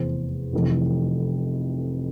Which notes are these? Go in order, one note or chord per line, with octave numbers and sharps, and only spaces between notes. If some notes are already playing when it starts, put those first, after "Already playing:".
Already playing: F1 E2 E3 C5
F1 F2 E3